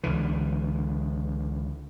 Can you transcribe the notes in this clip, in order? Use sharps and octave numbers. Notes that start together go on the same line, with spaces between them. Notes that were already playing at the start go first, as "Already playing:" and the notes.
C#2 D3 E3